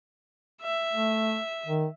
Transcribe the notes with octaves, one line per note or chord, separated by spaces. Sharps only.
E5
A3
D#3